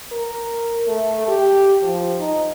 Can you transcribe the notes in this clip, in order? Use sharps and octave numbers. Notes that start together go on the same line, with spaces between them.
A#4
A3
G4
F3
D#4